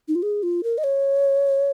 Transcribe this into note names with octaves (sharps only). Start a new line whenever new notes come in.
D#4
F4
G#4
F4
A#4
D#5
C#5